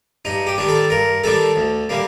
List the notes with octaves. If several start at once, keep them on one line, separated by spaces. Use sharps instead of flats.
G2 D#4
G4
D#3 G3 D4
A4
G2 A#4
D#3 G3 D4 A4
D2
D3 G3 A#3